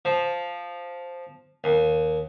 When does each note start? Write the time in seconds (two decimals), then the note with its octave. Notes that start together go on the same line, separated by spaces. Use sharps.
0.05 F3
1.64 D#2